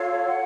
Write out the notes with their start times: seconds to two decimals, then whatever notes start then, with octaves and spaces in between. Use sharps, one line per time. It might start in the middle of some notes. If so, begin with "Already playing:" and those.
Already playing: F4 A4 C#5 F5
0.27 F#5